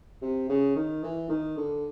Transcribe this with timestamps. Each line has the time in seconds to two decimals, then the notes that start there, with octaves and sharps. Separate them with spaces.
0.22 C3
0.49 C#3
0.76 D#3
1.03 E3
1.29 D#3
1.57 D3